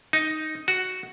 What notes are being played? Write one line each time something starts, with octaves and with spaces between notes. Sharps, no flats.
D#4
F#4